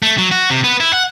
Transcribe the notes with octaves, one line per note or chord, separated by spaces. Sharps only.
A3
F#3
F#4
C3
B3
E4
F#5